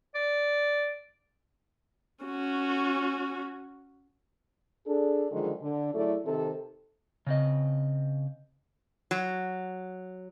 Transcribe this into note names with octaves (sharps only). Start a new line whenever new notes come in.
D5
C#4 F#4
D4 G#4 A4
D3 D#3 F3 F#3 G#3
D3
F#3 A3 E4 G#4 A4 D5
C3 D#3 A4
C#3 C4 D#5
F#3